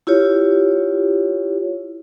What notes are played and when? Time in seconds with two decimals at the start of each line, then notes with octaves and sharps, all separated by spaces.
0.07 E4 F4 G4 C#5